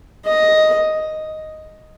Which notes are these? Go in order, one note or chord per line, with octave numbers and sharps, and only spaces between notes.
D#5